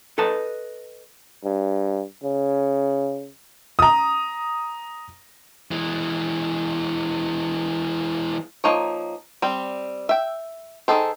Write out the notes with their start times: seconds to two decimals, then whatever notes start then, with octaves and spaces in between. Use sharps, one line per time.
0.18 A4 B4 D#5 A5
1.44 G2
2.24 C#3
3.79 A#5 D#6
5.71 E3 G#3
8.64 F3 A#3 D#4 C#5
9.42 G3 C4
10.09 E5 G5
10.88 D#3 G#3 G#4 A4 C5